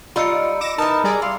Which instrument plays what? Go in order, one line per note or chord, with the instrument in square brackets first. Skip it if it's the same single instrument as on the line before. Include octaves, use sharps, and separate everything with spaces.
[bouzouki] G3 D#4 [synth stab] F4 [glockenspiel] B5 E6 C#7
[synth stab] D6 A#6 E7
[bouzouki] E3 B3 [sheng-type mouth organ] D#4 A#4 [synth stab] A5
[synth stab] G3 D5 [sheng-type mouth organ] G#4 A#4 A#5
[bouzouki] E4 [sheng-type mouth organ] F5 C6